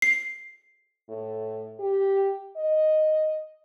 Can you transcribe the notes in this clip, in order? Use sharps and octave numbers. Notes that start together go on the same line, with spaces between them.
C7
A2
G4
D#5